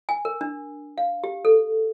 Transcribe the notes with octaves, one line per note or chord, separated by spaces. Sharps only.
G#5
A#4
D4
F5
G4
A4